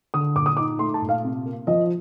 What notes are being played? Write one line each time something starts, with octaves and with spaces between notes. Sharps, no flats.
D3 D#6
A#2 D6
D#6
D#4 D6
A3 C6
A5
A#2
F5
C3
A#3
F3 D#5